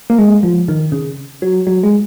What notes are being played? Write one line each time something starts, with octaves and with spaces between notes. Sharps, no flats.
A#3
G#3
F3
D#3
C#3
F#3
F#3
G#3